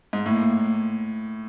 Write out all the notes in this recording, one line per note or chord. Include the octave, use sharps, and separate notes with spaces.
G#2
A2 A#3